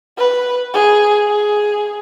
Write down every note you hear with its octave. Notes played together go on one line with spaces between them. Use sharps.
B4
G#4
G#4